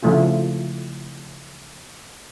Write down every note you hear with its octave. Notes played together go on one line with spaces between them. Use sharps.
C#3 F3 A3 E4 F4